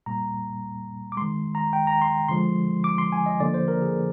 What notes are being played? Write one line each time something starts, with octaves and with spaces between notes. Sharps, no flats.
A#2 G3 A#3 A#5
D6
D#3 G#3 C6
A#5
G5
A#5
C6
D3 F3 G#3 C6
D6
C6
G#5
D#5
D3 F3 A#3 D5
C5
A#4
G#4